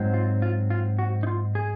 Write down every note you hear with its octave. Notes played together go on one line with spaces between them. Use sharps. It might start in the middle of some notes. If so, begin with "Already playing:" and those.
Already playing: G#2 F#3 C4
F4
F4
F4
F#4
D#4
F4
G#4